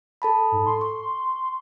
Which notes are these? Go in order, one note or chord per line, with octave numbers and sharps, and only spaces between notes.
A4 A5 B5
G#2
C6
C#6